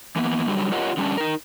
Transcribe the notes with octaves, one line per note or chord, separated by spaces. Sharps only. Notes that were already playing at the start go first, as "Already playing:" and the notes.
E3 A#3 B3
D3 F#3 G3
F4 G4 A#4 C#5 D#5 F#5
D3 G3 C#4 D4
D#4 A#4